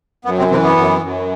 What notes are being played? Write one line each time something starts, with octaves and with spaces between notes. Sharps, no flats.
F#2 B3
C3 C4
C3 E3 C4
B3
F#2
F#2